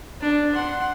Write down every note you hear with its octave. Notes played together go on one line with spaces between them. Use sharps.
D4
F#5 C6